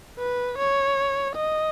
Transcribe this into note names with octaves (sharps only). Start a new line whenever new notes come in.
B4
C#5
D#5